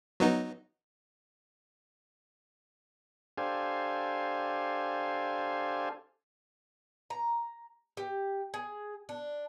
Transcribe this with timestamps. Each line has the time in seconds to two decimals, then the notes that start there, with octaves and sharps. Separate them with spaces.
0.20 F#3 B3 D#4
3.38 D4 G4 A4 C5 F5 G#5
7.10 A#5
7.97 G4
8.54 G#4
9.09 D4